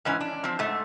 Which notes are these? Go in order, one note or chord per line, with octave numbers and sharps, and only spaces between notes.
G#2 E3 C#4
D4
F3 C4
G#2 A3